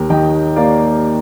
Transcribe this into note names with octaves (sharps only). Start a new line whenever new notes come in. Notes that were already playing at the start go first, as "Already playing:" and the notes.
Already playing: D#2 G4 A#4
D#3 D#5 G5
A#3 D5 F5